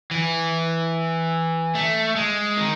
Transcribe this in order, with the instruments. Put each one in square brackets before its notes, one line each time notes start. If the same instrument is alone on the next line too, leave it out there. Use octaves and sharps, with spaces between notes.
[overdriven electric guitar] E3
A3
G#3
D#3